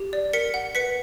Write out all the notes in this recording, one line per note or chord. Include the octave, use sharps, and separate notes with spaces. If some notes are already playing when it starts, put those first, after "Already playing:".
Already playing: G4
D5
A#4 B6 C#7
F#5
B4 B6 C#7